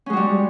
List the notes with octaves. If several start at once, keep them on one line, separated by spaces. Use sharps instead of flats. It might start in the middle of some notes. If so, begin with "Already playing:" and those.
G3 G#3 C#4 F#4